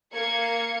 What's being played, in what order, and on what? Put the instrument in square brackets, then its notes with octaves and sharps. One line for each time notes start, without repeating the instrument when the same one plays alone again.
[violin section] A#3 G#6 C#7